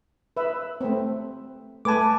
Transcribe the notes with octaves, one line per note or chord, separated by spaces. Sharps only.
B4 E5
A3 C4
A3 B4 G#5 A5 D6